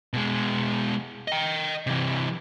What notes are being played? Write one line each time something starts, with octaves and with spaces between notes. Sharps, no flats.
B2 G#3
D#5 G5
C3 E3